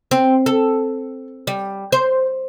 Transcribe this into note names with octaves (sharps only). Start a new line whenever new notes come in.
C4
A4
G3
C5